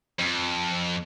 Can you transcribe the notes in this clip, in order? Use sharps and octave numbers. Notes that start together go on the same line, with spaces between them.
F2